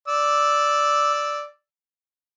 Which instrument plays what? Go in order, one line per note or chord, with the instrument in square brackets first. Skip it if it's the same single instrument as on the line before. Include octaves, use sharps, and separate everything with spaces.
[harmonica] D5 E6